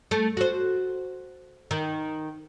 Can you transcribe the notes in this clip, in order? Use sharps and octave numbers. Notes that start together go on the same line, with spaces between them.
A3
F#4 C5
D#3